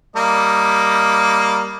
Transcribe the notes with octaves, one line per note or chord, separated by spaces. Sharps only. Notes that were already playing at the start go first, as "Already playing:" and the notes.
G3 A#3 D#5